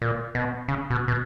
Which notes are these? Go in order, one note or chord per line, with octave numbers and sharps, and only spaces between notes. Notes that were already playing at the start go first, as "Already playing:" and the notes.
A#2
B2
C#3
B2
B2